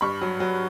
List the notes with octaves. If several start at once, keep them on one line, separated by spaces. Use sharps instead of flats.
G2 B5 C#6
F#3
F#3